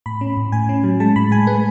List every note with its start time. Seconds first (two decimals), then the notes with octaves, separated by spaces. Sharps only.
0.06 A2 B5
0.21 C#4
0.37 A2
0.52 A2 G#5
0.69 C#4
0.84 F#3
1.00 G#3 A5
1.16 A2 B5
1.31 G#3 G#5
1.47 G#3 B4